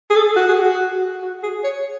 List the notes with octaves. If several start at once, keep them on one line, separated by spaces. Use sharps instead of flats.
G#4
A4
F#4
G#4
F#4
F#4
G#4
C#5